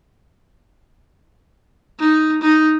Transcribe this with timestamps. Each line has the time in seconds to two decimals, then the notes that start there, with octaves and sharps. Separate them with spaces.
2.00 D#4
2.42 D#4